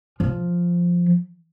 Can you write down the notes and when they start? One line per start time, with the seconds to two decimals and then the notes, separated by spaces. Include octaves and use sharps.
0.20 F3